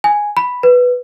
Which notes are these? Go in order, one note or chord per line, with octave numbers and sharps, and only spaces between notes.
G#5
B5
B4